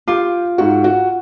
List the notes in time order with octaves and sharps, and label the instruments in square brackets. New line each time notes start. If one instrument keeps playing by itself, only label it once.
[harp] F4 [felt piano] G4 D6
[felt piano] G#2 F#4
F#4